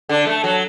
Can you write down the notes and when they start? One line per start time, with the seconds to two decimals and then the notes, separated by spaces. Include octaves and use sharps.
0.09 D3
0.27 A3
0.44 F#3